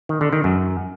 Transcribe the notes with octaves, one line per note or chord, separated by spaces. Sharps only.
D#3
D3
D#3
F#2